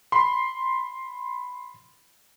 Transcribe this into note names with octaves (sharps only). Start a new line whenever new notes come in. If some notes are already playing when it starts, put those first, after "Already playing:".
B5 C6